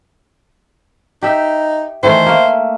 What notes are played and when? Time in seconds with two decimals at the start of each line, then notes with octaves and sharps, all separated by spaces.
1.22 D#4 G4 E5
2.03 D#3 E3 A3 C5
2.26 A3 A#3